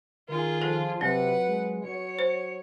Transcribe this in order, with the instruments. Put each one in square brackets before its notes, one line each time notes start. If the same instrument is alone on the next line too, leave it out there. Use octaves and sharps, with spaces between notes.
[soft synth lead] D#3 [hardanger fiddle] F4 G#4 [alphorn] A#4
[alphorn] F3 [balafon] A4
[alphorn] C3 [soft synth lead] F#3 [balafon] C4 [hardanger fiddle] B4 F#5
[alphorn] G#3
[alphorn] F#3 [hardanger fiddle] C#5 [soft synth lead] C#7
[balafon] C5